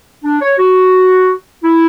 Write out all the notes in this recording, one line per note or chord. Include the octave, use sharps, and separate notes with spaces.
D4
C#5
F#4
E4